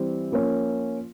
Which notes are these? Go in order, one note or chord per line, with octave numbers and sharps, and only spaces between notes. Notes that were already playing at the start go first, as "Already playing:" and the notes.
Already playing: E3 G3 C4
F3 A#3 C#4